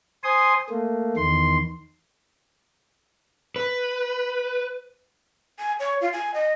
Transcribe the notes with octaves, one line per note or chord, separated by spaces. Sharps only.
C5 G#5 C6 D#6
A3 A#3
E2 D#3 C6
B4
G#5
C#5
F4
G#5
D#5